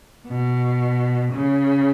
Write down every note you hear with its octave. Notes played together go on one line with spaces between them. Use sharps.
B2
C#3